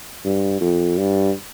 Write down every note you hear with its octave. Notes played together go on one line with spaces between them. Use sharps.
G2
F2
G2